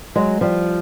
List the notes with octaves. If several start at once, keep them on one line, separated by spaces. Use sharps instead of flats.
F#3 G#3
F3 G3